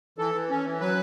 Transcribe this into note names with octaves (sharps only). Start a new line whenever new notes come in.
E3 A4
E3
C#4
E3
F#3 B4